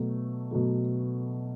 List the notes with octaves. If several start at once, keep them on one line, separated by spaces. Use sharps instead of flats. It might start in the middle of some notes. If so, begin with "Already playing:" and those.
Already playing: B2 F#3 A3
B2 F#3 A3